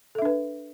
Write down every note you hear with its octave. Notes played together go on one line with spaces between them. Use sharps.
D4 A4 B4 E5